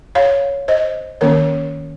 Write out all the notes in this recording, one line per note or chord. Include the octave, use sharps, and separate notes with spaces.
C#5 F5
C5 D#5
D#3 A#3 C#4 A#4 C#5